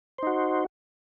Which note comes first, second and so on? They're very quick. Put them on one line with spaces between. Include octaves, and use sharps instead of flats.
C5 D#4 F#4